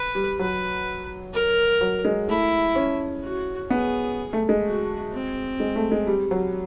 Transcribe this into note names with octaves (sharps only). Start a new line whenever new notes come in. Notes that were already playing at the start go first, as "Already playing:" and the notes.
Already playing: B4
G3
F#3 B4
A#4
F#3
G#3
A3 E4
C#4
F#4
B3 G#4
A3
G#3
F#4
C4
G#3
A3
G#3
G3
F#3